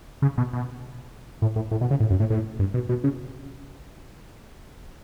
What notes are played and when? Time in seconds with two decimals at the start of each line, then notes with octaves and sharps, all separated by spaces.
0.22 C#3
0.38 B2
0.53 B2
1.42 A2
1.56 A2
1.71 A2
1.81 B2
1.91 C#3
2.00 A2
2.10 F#2
2.20 A2
2.30 A2
2.59 G2
2.74 B2
2.89 B2
3.04 C#3